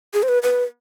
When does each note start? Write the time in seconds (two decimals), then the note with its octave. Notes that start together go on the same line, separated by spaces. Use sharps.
0.14 G#4
0.23 C5
0.29 B4
0.43 B4